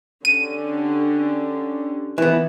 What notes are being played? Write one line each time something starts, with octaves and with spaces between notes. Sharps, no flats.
D3 C#4 G4 D#7
E3 B3